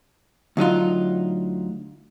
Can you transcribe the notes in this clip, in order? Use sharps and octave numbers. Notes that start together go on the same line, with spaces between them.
D2 F#3 D#4 F4